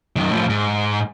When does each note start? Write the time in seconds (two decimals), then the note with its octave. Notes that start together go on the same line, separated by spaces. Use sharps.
0.16 F#2 D#3
0.31 A2 F3
0.49 G#2